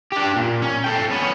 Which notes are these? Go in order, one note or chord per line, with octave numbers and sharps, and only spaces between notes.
D4 G4
A#2
C#4
A4 G5
B3 C#4